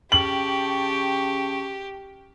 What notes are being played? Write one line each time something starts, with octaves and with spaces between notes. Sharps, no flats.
C#3 G4 G5 A5 C#6 F#7